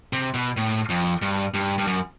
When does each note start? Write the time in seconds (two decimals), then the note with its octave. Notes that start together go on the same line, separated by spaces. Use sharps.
0.13 C3
0.34 B2
0.57 A2
0.89 F2
1.22 G2
1.54 G2
1.78 G2
1.87 F#2